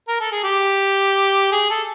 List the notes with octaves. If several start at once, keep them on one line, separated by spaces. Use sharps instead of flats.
A#4
A4
G#4
G4
G#4
A4